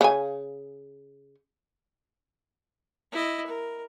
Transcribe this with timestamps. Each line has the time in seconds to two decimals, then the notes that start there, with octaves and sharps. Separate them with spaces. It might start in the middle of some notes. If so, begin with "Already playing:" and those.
0.01 C#3 G#5
3.12 E4 D#5
3.46 A#4